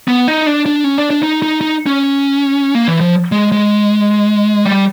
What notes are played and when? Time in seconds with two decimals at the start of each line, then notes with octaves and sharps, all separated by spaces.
0.08 B3
0.28 D#4
0.46 D4
0.66 D4
0.84 C#4
0.98 D4
1.10 D4
1.23 D#4
1.42 D#4
1.61 D#4
1.86 C#4
2.75 A#3
2.88 E3
3.00 F3
3.32 G#3
3.52 G#3
4.66 G3